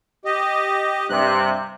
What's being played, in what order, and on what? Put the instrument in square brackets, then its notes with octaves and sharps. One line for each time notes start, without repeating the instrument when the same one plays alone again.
[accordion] G4 D#5
[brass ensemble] G2 C3 [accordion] F#6